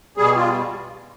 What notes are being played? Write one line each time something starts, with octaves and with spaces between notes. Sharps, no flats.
B2 G3 G#4
F4